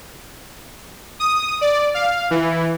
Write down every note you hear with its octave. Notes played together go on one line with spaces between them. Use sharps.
D#6
D5
F5
E3